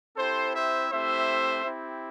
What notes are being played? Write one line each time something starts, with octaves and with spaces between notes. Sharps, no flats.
C4 E4 G4 A4 C5
C5 E5
A3 C4 E4 G4 C5 E5
C4 E4 G4